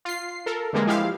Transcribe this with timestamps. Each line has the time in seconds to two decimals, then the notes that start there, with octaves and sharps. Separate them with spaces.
0.05 F4 C7
0.46 A4 A#4
0.73 D3 E3 G3 G#3 A#3
0.87 F3 G#3 E4 G4 E5 F5